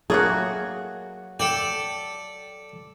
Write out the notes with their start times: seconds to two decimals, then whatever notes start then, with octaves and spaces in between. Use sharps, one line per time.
0.10 F#3 A3 A#3 F#4 G#4
1.40 A4 D5 G5